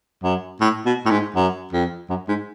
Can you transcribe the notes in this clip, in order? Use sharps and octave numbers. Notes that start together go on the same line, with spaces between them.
F#2
A2
B2
A2
G#2
F#2
F2
F#2
G#2